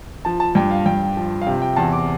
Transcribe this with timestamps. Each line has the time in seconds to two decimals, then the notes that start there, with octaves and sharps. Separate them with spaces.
0.25 F3 A5
0.40 A5
0.55 G2 G5
0.71 F5
0.86 G2 G5
1.17 F3
1.42 F5
1.46 C3 G5
1.62 G5
1.76 E2 A5
1.93 D6